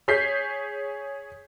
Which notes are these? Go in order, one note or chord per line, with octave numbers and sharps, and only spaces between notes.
G#4 C#5 G6 B6 C7